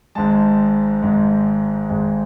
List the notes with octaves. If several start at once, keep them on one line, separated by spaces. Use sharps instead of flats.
G#1 G#2 G#3 A5
G#1 G#2 G#3
G#1 G#2 G#3